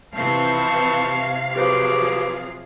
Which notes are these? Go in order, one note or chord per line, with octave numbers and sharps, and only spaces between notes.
C3 E3 F3 C4 F5 A5 C#6
F3 F#3 G4 G#4 B4 C5 D6